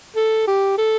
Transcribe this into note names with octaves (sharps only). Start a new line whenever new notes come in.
A4
G4
A4